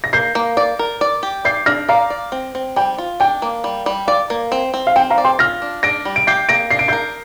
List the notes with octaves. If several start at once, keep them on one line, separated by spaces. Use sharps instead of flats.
A#6
A#3 G6 C7
A#3
D5
A#4
D5
G4
D5 G6 C7
D4 F6 A#6
D5 F5 A#5
D5
C4
C4
G3 G5
F4
D4 G5
A#3
G3
G3
D5 F5
A#3
C4
C4
F5
C4 G5
F5 A#5
D5
G5 C6
F4 F6 A#6
D4
D4 A#6 D7
G3
D7
G4 G6 C7
A#3 A#6 D7
D4 C7
D7
A#4 G6 C7